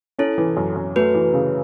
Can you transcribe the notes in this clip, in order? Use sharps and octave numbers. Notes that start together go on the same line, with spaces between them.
C#4 E4 A4
E3
F#2
F#2
A3 F#4 B4
E3
C#3